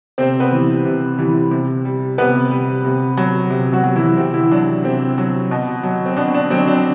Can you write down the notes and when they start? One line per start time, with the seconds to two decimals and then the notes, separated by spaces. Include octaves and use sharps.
0.18 C3 C4 C5
0.40 B3 B4
0.52 E3 G3
0.85 C3
1.18 E3 G3
1.51 C3
1.85 G3
2.18 C3 B3 B4
2.51 G3
2.85 C3
3.17 F#3
3.50 C3
3.73 F#3 F#4
3.84 F#3
3.96 E3 E4
4.17 C3 C4
4.34 E3 E4
4.51 F#3 D4
4.85 C3 C4
5.18 F#3
5.51 B2
5.83 F#3
6.06 C4
6.17 B2 D4
6.34 D4
6.50 F#3 C4
6.68 D4